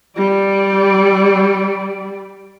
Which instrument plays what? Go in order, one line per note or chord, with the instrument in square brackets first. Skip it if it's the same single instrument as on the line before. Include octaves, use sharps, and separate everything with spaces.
[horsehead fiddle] G3 D5